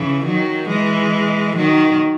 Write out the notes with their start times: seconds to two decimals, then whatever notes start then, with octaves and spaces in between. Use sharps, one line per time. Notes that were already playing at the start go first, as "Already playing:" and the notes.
Already playing: C#3 E3
0.26 D#3 F#3
0.69 E3 G#3
1.57 D#3 F#3